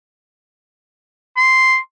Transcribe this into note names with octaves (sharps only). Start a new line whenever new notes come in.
C6